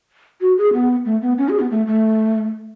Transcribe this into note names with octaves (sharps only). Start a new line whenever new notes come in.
F#4
G#4
B3
A3
B3
C#4
G#4
B3
A3
A3